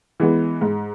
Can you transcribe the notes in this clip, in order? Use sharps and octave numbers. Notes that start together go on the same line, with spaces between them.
E3 G#3 B3
G#2